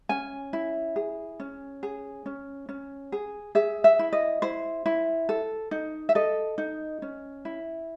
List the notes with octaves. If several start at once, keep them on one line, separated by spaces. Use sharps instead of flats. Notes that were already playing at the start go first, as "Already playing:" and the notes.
C#4 G#5
E4
G#4
C#4
G#4
C#4
C#4
G#4
G#4 E5
E5
E4
D#5
E4 C5
E4
A4
D#4
E5
A4 D#5
D#4
C#4
E4